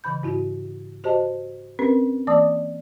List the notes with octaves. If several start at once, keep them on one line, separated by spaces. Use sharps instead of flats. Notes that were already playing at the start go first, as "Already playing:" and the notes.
C#3 E3 B5 G6
G#2 E4 F#4
F#4 G4 C5 D#5 A5
C4 C#4 G4 A#4 B4
E3 A#3 D5 A5 D6 D#6